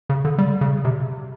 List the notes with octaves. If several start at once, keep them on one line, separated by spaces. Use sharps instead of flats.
C#3
D3
G3
C#3
C3